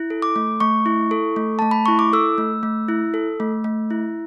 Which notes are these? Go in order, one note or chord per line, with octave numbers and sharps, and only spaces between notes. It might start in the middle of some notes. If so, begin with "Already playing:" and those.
Already playing: E4
A4
D6
A3
A3 C#6
E4
A4
A3
A3 A5
B5
E4 C#6
D6
A4 E6
A3
A3
E4
A4
A3
A3
E4